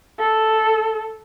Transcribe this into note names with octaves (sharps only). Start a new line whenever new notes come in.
A4